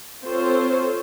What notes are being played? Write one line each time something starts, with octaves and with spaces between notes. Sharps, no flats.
C4 F4 A4 C5 C#5